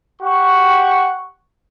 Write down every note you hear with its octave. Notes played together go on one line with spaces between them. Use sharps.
G4 F#5 C#6